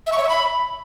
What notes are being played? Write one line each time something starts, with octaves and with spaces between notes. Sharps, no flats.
E5
C#6
C#5
E5
B5